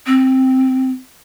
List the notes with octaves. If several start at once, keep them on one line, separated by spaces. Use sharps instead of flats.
C4